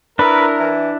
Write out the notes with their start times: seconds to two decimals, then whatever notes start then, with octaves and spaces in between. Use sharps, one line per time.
0.19 D4 E4 A#4 B4
0.60 E3